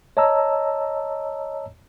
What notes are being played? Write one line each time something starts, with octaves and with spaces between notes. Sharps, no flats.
C#5 D#5 A5 A#5 E6